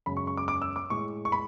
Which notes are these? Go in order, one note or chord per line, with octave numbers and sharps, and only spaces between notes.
F#2 C#3 G#3 B5
C#6
C#6
D6
D6
E6
D6
A2 G#3 C#6
C#6
B5